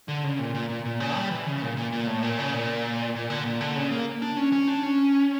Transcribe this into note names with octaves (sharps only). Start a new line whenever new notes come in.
D3
C#3
A#2
A#2
A#2
A#2
C#3
G3
E3
C#3
A#2
A#2
A#2
A2
A#2
C#3
A#2
A#2
D3
A#2
D3
C#3
A#3
D4
C#4
C#4
D4
C#4